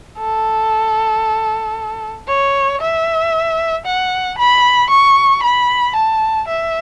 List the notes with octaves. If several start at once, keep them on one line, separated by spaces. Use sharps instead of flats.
A4
C#5
E5
F#5
B5
C#6
B5
A5
E5